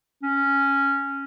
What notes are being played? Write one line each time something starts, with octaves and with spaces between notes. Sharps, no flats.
C#4